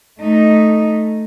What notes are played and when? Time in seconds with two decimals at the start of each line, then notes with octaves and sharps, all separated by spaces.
0.20 A3 D#4